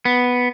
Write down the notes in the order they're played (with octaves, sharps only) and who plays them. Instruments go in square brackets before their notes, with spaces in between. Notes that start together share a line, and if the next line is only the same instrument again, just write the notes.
[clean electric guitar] B3